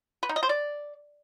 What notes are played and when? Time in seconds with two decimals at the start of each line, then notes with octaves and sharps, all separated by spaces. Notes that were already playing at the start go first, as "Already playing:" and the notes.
0.23 B4
0.29 D#4
0.36 D#5
0.43 C5
0.49 D5